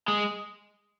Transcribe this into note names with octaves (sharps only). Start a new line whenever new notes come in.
G#3